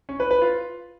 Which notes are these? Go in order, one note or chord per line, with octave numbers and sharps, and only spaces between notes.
C#4
B4
B4
F4